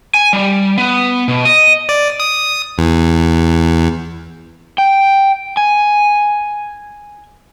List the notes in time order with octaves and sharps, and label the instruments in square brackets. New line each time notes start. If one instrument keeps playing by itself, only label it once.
[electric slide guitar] G#5
G3
B3
B2
D#5
[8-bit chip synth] D5
D#6
E2
[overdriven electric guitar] G5
G#5